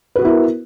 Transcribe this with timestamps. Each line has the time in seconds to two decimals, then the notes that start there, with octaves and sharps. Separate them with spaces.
0.16 B4
0.19 F#4
0.22 B3
0.25 E4
0.28 A#4